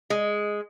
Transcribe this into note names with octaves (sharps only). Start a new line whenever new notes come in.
G#3